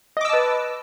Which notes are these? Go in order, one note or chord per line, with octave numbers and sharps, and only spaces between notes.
B4 D#5 A5 D6 E6